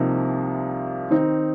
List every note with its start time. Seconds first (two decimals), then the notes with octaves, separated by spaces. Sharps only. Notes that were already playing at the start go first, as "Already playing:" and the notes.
Already playing: C2 C3 F3 A#3 D#4
1.10 D#3 C4 D#4